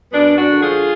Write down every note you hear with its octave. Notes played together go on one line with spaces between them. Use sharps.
F#2 B3 D4
D4 F#4
D3 G#3
F4 G#4